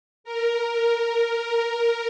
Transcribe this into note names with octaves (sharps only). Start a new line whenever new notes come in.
A#4